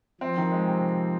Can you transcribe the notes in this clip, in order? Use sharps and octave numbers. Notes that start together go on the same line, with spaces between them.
F3 C4
D#3
G#3
C3